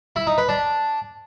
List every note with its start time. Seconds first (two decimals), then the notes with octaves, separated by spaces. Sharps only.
0.16 E4
0.27 D#4
0.38 B4
0.49 D4